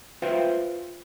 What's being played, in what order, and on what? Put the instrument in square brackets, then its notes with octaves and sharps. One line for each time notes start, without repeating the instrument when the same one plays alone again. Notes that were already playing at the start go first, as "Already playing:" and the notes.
[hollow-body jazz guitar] F4 B4 C5 E5 F5 G5